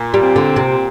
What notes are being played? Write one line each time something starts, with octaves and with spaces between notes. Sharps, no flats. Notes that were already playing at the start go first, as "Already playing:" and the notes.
Already playing: A#2
G3
C4
D3
A#2
C3